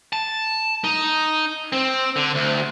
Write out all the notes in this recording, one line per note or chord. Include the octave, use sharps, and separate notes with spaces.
A5
D#4
C4
D3
D2